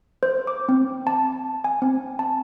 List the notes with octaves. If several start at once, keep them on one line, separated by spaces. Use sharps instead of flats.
C5
D6
C4
A5
G#5
C4
A5